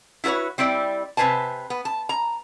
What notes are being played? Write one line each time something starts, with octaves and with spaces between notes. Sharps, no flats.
E4 F#4 A4 B4 C#5
G3 C4 E4 G4 D5
C3 B4 C5 G#5 A5
B3
A5
A#5